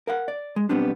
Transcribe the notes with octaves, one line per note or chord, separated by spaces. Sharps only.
A#4 F5 F#5
D5
G#3
B1 G3 B3 C4 D4